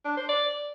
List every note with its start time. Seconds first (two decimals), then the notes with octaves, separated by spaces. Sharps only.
0.05 D4
0.17 C5
0.29 D5